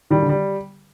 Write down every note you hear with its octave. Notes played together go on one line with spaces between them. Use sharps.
D#3 G3
D3
G3